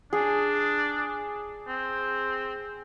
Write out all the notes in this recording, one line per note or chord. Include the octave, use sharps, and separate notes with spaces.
D4 G#4
C4